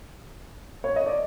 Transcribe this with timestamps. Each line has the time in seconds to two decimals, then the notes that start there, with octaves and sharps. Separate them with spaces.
0.84 C#5
0.96 D#5
1.06 D5